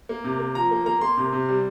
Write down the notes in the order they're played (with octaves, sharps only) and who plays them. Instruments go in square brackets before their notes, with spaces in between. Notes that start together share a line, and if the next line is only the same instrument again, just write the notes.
[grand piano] A#3
C3
A#3
F3 A#5
A#3
A#3 A#5
A#3 C6
C3
C3
G3